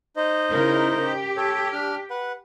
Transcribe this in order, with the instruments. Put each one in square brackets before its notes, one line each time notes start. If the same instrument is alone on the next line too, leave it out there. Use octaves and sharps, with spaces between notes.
[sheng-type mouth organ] D#4 C5 D#5
[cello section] C#3 E4 A#4
G4
[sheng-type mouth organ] A4 C#5
D4 F6
B4 F#5